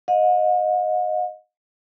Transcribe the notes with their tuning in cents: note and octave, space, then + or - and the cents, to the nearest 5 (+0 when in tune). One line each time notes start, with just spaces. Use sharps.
D#5 +0 F#5 -45